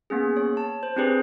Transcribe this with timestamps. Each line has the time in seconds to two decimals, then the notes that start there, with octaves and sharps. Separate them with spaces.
0.10 A#3 B3 C#4 G#4
0.37 C#5
0.57 A5
0.83 C5
0.96 C4 D4 G4 G#4 B4 C5